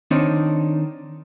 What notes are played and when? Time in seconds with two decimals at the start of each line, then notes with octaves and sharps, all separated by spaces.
0.11 D#3 C4 D4 D#4 C#5